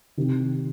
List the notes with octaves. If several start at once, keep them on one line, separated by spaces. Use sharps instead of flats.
C3 D#3